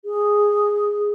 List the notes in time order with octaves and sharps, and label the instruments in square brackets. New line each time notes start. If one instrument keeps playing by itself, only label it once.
[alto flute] G#4